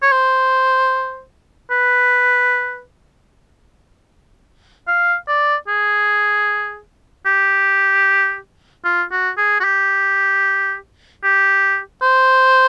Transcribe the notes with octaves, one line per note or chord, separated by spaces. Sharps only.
C#5
C5
B4
F5
D5
G#4
G4
F4
F#4
G#4
F#4
G4
G4
C5